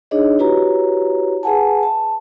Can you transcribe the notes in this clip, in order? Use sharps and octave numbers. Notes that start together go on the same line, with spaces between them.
D4 D#4 G#4 C#5 D#5
E4 F#4 G4 B4 C#5 A#5
G#4 B4 F#5 G#5 A5
A5